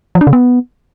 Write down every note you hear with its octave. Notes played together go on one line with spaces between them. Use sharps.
F3
D4
C#3
B3